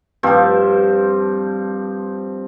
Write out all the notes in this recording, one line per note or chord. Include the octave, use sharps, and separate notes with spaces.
G2 F3 C4